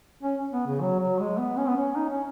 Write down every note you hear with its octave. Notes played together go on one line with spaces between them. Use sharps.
C#4
B3
C#3
F#3
F#3
G#3
B3
C#4
B3
C#4
D#4
C#4